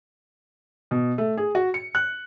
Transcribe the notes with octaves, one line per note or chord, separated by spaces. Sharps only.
B2
A3
G#4
F#4
C#7
F#6